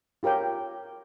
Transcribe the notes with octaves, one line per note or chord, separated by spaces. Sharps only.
F4 G4 A#4 C#5 G5